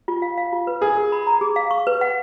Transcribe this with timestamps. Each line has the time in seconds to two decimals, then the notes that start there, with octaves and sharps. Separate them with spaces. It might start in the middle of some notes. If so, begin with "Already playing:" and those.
0.08 F4
0.22 F5
0.38 F5
0.52 F4
0.67 B4
0.81 G#4 A#4
0.97 A#4
1.12 B5
1.27 A#5
1.41 G#4
1.56 F5
1.71 C#6
1.87 B4
2.01 F#5